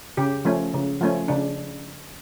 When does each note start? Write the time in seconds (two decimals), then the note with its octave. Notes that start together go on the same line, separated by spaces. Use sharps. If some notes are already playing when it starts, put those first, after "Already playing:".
0.17 C#3 G4
0.45 F3 A3 C#4
0.74 C#3
1.01 F3 A3 C#4
1.28 C#3 D4